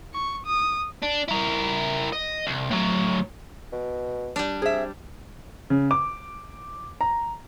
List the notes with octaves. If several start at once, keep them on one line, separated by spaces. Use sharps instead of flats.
C#6
D#6
D4
E4 A#4
D#5
C2
A2 F#3
B2
G3 D4
C4 G#4 E5
C#3
D6
A#5